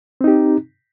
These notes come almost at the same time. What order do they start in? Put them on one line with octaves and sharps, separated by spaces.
C4 D#4 G4